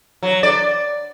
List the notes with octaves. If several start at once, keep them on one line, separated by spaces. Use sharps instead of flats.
F#3
D5